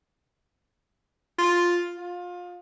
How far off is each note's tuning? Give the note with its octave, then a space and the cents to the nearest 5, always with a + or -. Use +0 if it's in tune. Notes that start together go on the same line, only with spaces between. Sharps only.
F4 +5
F4 +25